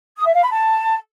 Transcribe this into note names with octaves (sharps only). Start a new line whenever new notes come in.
D#6
E5
F5
B5
A5